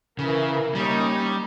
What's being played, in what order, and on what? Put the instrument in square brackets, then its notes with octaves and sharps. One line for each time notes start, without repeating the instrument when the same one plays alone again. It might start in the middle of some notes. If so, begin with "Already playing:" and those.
[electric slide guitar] C#3 [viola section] E3 A#4
[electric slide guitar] G3 [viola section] A#3 C#4 D#4